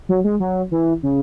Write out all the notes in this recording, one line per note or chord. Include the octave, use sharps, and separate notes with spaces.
F#3
G#3
F#3
E3
C#3